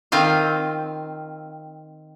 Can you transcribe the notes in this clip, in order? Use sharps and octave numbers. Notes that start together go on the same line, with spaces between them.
D#3 C4 F4 F5